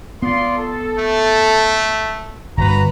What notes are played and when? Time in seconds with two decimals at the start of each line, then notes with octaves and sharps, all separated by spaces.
0.22 B3 F4 D5 C6
0.57 A4
0.99 A3
2.57 G1 F#4 B4 A#5